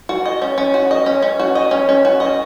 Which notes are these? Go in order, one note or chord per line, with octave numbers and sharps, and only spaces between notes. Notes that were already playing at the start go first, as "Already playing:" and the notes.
F#4
D#5
C#4
C#4
F#4
D#5
C#4
C#4
F#4
D#5
C#4
C#4
F#4
D#5